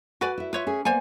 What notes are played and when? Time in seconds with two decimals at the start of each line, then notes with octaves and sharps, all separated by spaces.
0.21 F#4 B4 D5 F#5 G#5
0.38 E4 E5
0.53 F4 B4 C#5 E5
0.67 C#4 G#4
0.85 A#3 B3 C5 D5 G#5